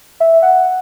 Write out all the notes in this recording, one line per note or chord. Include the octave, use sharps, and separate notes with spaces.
E5
F#5